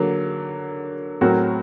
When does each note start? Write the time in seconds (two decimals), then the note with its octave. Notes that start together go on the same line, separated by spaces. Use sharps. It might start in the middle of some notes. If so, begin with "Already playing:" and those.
Already playing: D3 F#3 A#3
1.21 A2 F#3 C4 F#4 A#4